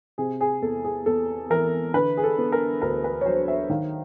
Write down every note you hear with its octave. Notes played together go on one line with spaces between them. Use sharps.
C3 G#4
G#4
E2 A4
G#4
E2 A4
E3 A#4
D3 B4
G#4
A4
B3
A#4
D2 A#4
B4
C#5
F#3 C5
E5
D#3 F5